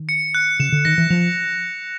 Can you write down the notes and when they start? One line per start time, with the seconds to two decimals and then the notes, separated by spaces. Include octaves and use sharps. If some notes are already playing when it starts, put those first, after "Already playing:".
Already playing: D#3
0.09 C#7
0.35 F#6
0.60 C#3 E7
0.72 D3
0.85 D#3 A#6
0.98 E3
1.10 F3 F7